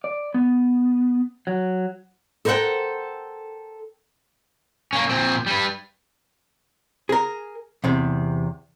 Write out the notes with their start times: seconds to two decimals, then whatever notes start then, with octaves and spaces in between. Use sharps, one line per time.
0.04 D5
0.34 B3
1.47 F#3
2.45 A4 A#4 C5 E5 F#5 G5
4.93 A#3 C#4
5.09 A#2 C4
5.47 G3 B4
7.09 G#4 A#4
7.84 E2 C3